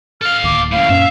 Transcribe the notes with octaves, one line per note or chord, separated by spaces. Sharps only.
A4 F5 F6
D1 D#2 D6
F#2 A2 F5
F#2 A#2 C#4 E5